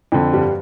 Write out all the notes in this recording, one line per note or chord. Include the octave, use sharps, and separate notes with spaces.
F2 D3
G2 G3